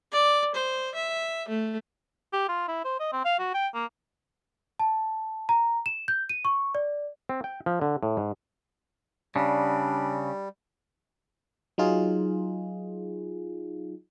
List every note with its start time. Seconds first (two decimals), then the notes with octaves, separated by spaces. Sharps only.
0.12 D5
0.55 C5
0.95 E5
1.48 A3
2.33 G4
2.48 F4
2.68 E4
2.85 C5
3.00 D#5
3.12 C4
3.25 F5
3.39 F#4
3.54 G5
3.74 A#3
4.79 A5
5.49 A#5
5.86 E7
6.08 G6
6.29 D#7
6.45 C#6
6.75 D5
7.29 C4
7.44 G5
7.66 F3
7.82 D3
8.03 A2
8.17 G#2
9.36 C#3 G3 D4
11.78 F#3 D#4 F4 G#4